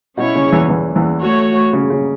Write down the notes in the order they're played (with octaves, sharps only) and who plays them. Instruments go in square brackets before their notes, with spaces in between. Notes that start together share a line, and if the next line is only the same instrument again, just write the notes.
[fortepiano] B2 [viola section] C#4 E4 C#5
[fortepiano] C#3
E2 E3
E2 E3
E2 E3
[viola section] A3 F#4 C#5
[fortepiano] C#3
C#3